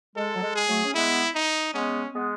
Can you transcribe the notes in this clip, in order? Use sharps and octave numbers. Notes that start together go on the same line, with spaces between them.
G#3 A4
F#3
G#3
G#4
F#3 A3
C#4
G#3 B3 E4
D#4
G#3 B3 C#4
G#3 B3